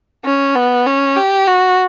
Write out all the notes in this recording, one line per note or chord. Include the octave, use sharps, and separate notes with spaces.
C#4
B3
C#4
G4
F#4